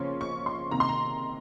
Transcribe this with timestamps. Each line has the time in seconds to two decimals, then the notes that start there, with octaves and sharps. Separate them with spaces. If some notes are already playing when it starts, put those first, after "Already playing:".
Already playing: C#3 F3 A#3 C#4 C6
0.21 C#6
0.46 C6
0.71 C3 D#3 A#3 A#5
0.80 C6
0.89 A#5